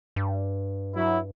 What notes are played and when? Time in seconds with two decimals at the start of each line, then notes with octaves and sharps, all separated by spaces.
0.16 G2
0.95 F#3 E4